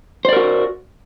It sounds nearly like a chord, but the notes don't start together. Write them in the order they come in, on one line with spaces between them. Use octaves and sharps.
C5 D5 A#4 F#4